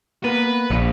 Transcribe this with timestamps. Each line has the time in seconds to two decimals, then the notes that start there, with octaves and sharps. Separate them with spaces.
0.24 A#3 B3 B4
0.70 A#1